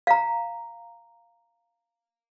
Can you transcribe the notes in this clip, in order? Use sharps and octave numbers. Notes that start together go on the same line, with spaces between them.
F5 A#5